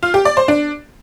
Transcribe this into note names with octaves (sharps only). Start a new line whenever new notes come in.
F4
G4
D5
C5
D4